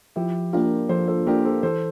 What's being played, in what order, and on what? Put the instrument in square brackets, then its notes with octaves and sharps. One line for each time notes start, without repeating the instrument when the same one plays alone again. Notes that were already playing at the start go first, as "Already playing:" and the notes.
[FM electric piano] F3 [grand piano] E4 G4
[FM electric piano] A#3 D4 F4 [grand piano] G4 A#4
[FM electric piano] F3 [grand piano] A4 C5
[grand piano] A4 C5
[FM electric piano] A#3 D4 F4 [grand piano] G4 A#4
[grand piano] A4 C5
[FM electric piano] E3 [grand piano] A4 C5